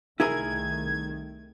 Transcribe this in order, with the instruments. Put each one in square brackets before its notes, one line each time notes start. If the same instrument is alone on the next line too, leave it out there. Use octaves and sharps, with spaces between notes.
[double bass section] C2 D#3 A3 [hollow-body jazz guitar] E4 G#4 A#4 [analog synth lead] G#6